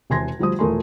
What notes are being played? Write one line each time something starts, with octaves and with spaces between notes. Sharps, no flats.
E1 C3 G#5 C6 G#6 A#6
D2 F3 G3 C5 D#6
E1 A#2 A3 A#4 G#5 C6